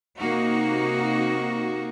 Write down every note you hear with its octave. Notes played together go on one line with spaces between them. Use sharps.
C3 A#3 D#4 F#4